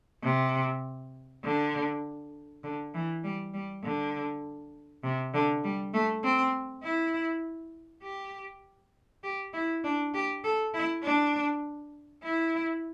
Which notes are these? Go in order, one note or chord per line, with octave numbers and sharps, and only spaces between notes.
C3
D3
D3
E3
G3
G3
D3
C3
D3
G3
A3
C4
E4
G4
G4
E4
D4
G4
A4
E4
D4
E4